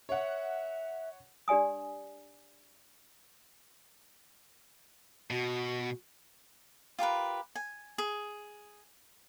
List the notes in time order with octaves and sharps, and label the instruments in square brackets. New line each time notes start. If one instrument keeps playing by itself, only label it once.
[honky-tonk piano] C#5 F#5 [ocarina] E5
[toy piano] D4 G4 D5 G#5 D#6
[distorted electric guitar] B2 [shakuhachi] F#4
[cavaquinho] F4 G4 A#4 B4
G#5
G#4